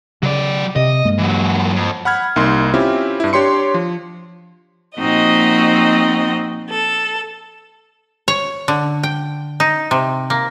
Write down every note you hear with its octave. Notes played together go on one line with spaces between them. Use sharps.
C#3 F#3 D5
C3 D#5
G2 G#3 A#3
E3 F#3
F2
F#5 B5 F6 G#6
C2 A#3 D#4 C6
C4 C#4 E4 F4 G4
G2 E4
D4 G4 C#5 C6 C#7
F3
A#2 F3 C4 D#4 F#4 D#5
A4
C#5
D3
G5
D#4
C3
A#3